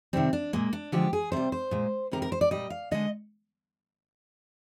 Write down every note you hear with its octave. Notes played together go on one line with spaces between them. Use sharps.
C3 D#3 G3 C4
D4
A#2 G#3 A#3
D4
D3 F3 G#3 G4
G#4
C3 G3 C5
C5
A#2 G#3
C3 D#3 G3 A#4
A#4
C5
D5
A#2 G3 D#5
F5
D3 G#3 D#5